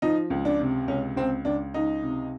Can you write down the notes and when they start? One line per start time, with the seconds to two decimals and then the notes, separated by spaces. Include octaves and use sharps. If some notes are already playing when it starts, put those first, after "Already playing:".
0.02 F3 D#4
0.30 C#2
0.45 D4
0.60 C3
0.88 C#2 C#4
1.16 C#2 C4
1.45 C#2 D4
1.74 C#2 D#4
2.03 C3